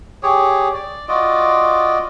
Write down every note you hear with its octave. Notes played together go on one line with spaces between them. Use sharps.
G4 G#4 C#5
D5
F4 F#4 D5 D#5